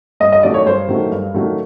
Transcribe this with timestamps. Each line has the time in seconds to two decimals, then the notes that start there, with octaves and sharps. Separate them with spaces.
0.20 G2 D#5
0.32 D#5
0.43 D#3 F#3 A3 D5
0.54 C#5
0.65 G2 C5
0.89 D#3 F#3 A3
1.11 G2
1.34 D#3 F#3 A3